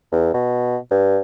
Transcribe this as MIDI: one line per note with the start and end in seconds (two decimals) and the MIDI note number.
0.12 0.31 40
0.34 0.77 47
0.91 1.20 43